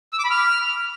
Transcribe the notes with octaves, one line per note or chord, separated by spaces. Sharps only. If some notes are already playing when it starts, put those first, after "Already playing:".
E6
D6
B5
F6